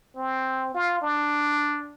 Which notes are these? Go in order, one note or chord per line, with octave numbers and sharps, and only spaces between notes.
C4
F4
D4